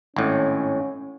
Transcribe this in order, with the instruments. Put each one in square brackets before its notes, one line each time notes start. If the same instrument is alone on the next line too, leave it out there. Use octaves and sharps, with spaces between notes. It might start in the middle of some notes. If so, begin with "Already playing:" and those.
[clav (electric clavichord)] G#1 A2 [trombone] C#4